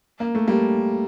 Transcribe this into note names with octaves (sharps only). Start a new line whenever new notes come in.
A#3
A3
G3 A#3